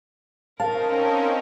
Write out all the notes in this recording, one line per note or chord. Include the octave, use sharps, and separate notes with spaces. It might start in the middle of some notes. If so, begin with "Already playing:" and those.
C4 C#4 D#4 A#4 F5 A5